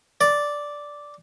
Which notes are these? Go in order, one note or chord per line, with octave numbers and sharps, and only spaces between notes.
D5